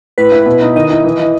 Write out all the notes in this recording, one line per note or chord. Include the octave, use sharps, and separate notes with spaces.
A2 B4
E4
B2
D#4
D#3 D#5
E4
E3
E3